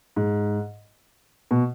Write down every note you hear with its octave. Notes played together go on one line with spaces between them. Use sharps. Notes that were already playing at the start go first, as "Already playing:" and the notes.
G#2
B2